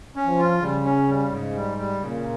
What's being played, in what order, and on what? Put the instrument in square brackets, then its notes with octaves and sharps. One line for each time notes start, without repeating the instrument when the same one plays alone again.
[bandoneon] C#4
[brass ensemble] F3
[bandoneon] F4
[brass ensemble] C#3 [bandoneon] G3
[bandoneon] C#4
G3
[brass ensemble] G#2 [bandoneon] C#3
[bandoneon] G3
G3
[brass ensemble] A#2 [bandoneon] C#3